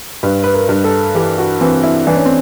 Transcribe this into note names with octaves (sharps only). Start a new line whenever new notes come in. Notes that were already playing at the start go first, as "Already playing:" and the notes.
G2 B4
B4
A#4
G2
A4
E3 G4
F#4
E3 C4
E4
E3 D4
C#4
C4